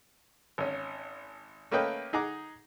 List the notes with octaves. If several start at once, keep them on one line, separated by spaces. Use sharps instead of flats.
G#1 C#4
A3 A#3 C#4 B4 D#5 G5
D#4 G#4 F#5 A#5 D6